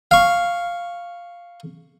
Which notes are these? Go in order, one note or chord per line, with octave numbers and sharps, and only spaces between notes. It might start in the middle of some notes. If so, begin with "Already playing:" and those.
F5 C#6